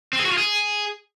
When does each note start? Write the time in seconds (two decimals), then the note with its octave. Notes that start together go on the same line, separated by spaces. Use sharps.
0.13 C4
0.19 G#4
0.25 F#4
0.32 F4
0.38 G#4